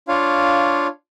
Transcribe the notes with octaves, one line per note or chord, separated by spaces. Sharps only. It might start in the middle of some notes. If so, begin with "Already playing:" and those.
D4 F4 C#5 F5